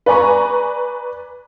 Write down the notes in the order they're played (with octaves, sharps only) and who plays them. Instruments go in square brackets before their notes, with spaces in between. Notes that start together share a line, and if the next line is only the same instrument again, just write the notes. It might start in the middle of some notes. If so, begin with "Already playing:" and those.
[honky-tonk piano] B4 D5 G#5 A#5 C#6